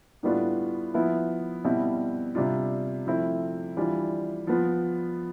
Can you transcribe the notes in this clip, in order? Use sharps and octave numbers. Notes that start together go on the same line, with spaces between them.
A2 G3 B3 D4 F4
F3 B3 E4
B2 G3 C4 E4
C3 G3 D4 F4
F3 A3 C4 E4
E3 G3 D4 F4
F3 B3 F4